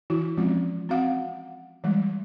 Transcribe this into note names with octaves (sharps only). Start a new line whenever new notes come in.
E3 E4 F#4
F3 G#3 C4 C#4 F4
C4 F#4 F5 F#5
E3 G3 G#3